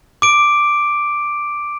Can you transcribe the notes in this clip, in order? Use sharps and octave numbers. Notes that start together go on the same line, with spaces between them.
D6 D7